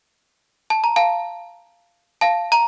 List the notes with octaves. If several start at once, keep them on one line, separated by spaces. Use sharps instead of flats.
A5
A#5
F5 A5
F5 A5
A#5